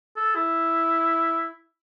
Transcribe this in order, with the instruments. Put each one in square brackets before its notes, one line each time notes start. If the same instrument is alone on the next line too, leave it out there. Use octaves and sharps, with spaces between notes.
[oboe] A4
E4